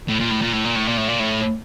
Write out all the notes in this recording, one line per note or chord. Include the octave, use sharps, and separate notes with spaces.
A2
A#2
A2
A#2
A2
A#2
A2
A#2
A2
A#2
A2